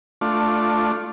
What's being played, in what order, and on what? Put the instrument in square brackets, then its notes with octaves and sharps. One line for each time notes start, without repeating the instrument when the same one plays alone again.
[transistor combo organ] A3 D4 F4